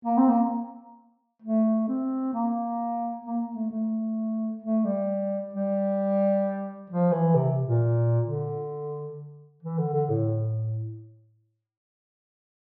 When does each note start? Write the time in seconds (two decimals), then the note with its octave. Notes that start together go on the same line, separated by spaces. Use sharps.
0.05 A#3
0.18 C4
0.29 A#3
1.42 A3
1.88 C4
2.34 A#3
3.25 A#3
3.55 A3
3.70 A3
4.62 A3
4.85 G3
5.53 G3
6.90 F3
7.12 E3
7.35 C3
7.65 A#2
8.26 D3
9.63 E3
9.78 D3
9.94 D3
10.09 A2